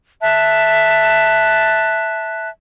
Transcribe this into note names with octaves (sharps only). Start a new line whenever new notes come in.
E5 A5 F#6